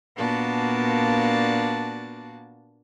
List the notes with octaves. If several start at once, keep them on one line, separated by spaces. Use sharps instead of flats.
A#2 A#3 B3 D4 F#4 A5